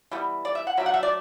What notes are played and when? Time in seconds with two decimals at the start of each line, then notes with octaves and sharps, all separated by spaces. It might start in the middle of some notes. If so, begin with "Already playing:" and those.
0.11 E3 G3 B3
0.45 D5
0.55 E5
0.67 F#5
0.77 F#3 A3 D4 E5
0.86 F#5
0.94 E5
1.03 D5